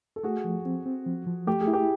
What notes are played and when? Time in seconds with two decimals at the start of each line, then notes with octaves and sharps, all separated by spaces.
0.16 A4
0.23 A3 F#4 G#4
0.44 F3
0.65 C4
0.86 C4
1.06 F3
1.27 F3
1.47 A3 G4
1.61 G#4
1.68 E4
1.74 G4